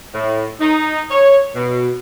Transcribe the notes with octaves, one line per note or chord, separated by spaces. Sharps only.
A2
D#4
C#5
B2